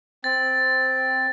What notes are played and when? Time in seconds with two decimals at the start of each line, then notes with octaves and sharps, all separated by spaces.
0.24 C4 A6